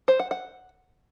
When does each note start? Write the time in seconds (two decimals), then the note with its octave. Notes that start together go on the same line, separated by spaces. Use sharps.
0.08 C5
0.20 F#5
0.31 F#5